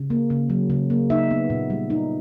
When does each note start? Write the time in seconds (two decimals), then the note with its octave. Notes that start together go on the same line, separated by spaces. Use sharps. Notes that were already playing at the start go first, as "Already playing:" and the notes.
Already playing: C#3
0.10 A#3
0.30 C#3
0.50 F#3
0.70 C#3
0.90 A#3
1.10 D#4 E5
1.31 B3
1.50 A#2
1.70 G3
1.90 D#4